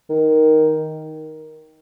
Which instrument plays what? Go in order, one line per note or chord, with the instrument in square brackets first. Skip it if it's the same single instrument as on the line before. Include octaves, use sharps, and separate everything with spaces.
[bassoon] D#3